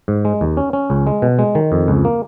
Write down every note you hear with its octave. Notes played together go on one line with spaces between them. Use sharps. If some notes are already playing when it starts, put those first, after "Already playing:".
G#2
G#3
D#2
C#4
C#4
C#2
G#3
B2
G#3
D#3
F2
C#2
A#3